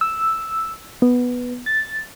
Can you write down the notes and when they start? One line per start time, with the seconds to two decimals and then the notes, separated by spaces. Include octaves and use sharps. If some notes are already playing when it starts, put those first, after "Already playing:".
0.01 E6
1.02 B3
1.66 A6